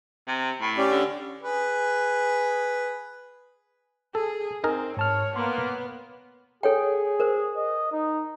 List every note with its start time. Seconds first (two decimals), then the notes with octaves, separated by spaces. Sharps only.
0.28 C3
0.61 A2
0.78 C#4 G4 D5
0.91 D3
1.43 G#4 B4
4.15 G#4 A4
4.64 C4 D#4 G#4 A#4
4.97 G#2 C#5 A5 F6
5.36 A#3 B3 C6
6.63 G#4 A4 C#5 G5
7.20 A#4 C5
7.57 D#5
7.92 D#4